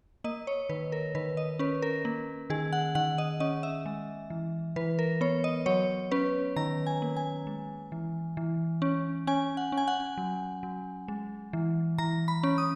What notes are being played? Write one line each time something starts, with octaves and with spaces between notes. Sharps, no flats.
A#3 D#5
C#5
D#3 B4
A#4
D#3 B4
D#5
C#4 B4
A#4
A#3
D#3 G#4
F#5
D#3 F#5
D#5
C#4 D#5
E5
G#3
E3
E3 B4
A#4
B3 C#5
D#5
F#3 C#5
C#4 B4
D#3 A#5
G#5
A#3
G#5
G#3
E3
E3
C#4
C#4 G#5
F#5
C#4
G#5
F#5
F#3
F#3
G#3
E3
E3 A#5
B5
C#4
D#6